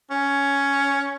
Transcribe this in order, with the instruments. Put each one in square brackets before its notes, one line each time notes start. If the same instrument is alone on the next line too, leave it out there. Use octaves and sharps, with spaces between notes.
[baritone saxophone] C#4